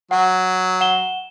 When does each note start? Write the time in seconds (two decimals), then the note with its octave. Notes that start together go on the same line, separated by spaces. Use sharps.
0.11 F#3 F#5
0.81 F#5 E7 G7